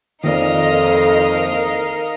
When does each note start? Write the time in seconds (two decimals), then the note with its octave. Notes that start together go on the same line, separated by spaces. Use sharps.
0.24 F2 D#3 A#3 D#4 A#4 D5 D#5 F5